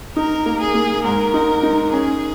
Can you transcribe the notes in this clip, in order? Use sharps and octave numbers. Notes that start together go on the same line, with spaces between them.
D#4 A#4
A#3
G#4
A#3
G#2 A#4
D#4
D#4
C#4 G#4